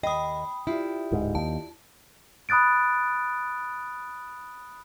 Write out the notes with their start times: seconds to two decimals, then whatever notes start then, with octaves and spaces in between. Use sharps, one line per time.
0.03 D#2 D#5 G5 B5 D#6
0.67 E4 F4 G4 D5
1.12 D1 G#2
1.35 D#2 A5
2.49 B5 D#6 F#6 A6 D7